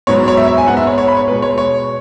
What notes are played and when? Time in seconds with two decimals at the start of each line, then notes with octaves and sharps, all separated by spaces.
0.07 G#2 F#3 B3 C#5
0.28 C#5
0.37 E5
0.48 E5
0.58 G#5
0.68 G#2 G#3 B3 F#5
0.77 E5
0.87 C#5
0.98 C#5
1.08 B5
1.17 C#5
1.28 B2 G#3 B3 B4
1.42 C#5
1.58 C#5